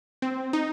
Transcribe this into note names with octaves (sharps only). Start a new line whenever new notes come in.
C4
D#4